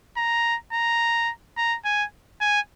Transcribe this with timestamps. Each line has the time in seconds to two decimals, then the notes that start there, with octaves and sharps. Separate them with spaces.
0.17 A#5
0.73 A#5
1.57 A#5
1.85 G#5
2.41 G#5